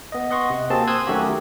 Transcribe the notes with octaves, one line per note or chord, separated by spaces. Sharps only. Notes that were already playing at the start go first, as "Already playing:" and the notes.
B3 D#5
D#5 F#5 C6 C#6
C3
A#3 C4 F#4 G#4 A5
C6 D#6 E6 F#6 G#6
D#3 F#3 A3 C#4 F#4 G4